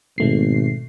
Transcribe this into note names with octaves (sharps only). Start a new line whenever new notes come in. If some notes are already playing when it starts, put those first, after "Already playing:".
G#1 B2 A3 C7